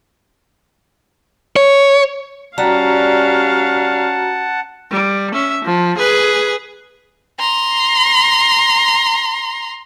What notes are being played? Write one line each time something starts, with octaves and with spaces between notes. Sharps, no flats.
C#5
G3 C#4 F#4 F5 F#5 A5 A#5
G3
C#4 E5
F3
G#4 B4
A#5 C6